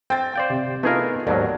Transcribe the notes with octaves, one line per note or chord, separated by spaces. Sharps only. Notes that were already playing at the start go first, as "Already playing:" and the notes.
C4 G5 A6
C5 D5 F5 G5
C3
A3 B3 D#4 F4 G#4 A#4
D#2 G#2 F#3 A#4 D5 A5